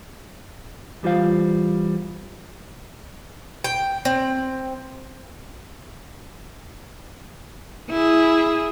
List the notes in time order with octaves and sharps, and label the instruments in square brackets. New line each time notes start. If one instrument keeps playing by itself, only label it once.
[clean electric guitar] E2 G3 F4 C5 F5
[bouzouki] G5
C4
[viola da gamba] E4 G#4